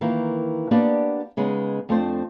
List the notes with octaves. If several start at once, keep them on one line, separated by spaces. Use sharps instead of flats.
D#3 E3 A#3 F4
A#3 B3 D4 G4 D5 F#5
C#3 G#3 B3 D#4
F2 A3 C4 D4 C5